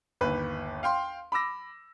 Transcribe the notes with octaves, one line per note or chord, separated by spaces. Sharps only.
G1 D#2 B4
F5 G5 C6
B5 D6 E6 A#6